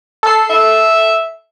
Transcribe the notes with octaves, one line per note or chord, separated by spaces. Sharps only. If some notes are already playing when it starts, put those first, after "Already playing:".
A4 C7
E5